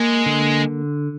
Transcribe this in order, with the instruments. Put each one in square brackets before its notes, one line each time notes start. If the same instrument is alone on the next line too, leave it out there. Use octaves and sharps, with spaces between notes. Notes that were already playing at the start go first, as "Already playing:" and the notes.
Already playing: [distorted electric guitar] G#3 [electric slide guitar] A#3
[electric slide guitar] D3